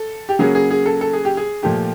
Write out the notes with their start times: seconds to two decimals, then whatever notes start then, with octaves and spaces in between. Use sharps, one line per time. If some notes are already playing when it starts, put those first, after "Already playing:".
Already playing: A4
0.29 G4
0.39 C#3 F#3 A#3 C#4 G#4
0.55 G#4
0.71 G#4
0.86 A4
1.01 A4
1.13 G#4
1.25 G4
1.37 G#4
1.63 A#2 F3 A3 G4